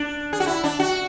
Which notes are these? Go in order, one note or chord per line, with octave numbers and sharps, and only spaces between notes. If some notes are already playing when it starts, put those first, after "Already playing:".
Already playing: D4
G#4
F#4
E4
D4
F#4